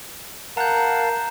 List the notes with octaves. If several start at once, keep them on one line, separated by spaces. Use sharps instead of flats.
A#4 F5 F#5 A5 A#5 G6